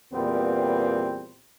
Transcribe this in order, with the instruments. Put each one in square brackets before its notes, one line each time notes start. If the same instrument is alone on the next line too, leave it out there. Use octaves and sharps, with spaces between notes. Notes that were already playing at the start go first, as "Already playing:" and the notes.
[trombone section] E2 A#2 G3 B3 C4